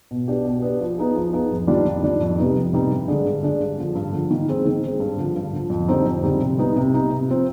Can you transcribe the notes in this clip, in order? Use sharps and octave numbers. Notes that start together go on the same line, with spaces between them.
B2
B3 D4 G4
B2
B3 D4 G4
F3
B3 D#4 G#4
F3
B3 D#4 G#4
F2
D#3 G3 D4 F4
F2
D#3 G3 D4 F4
F2
C3 G3 B3 D#4
F2
C3 G3 B3 D#4
G2
D3 G#3 D4
G2
D3 G#3 D4
G2
D3 F3
G2
D3 F3
D#3
G#3 C4
D#3
G#3 C4
G2
D3 F3
G2
D3 F3
F2
D3 G3 C4 D#4
F2
D3 G3 C4 D#4
C3
G3 B3 D#4
C3
G3 B3 D#4
C3
F3 C4